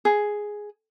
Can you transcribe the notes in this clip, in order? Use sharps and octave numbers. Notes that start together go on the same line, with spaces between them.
G#4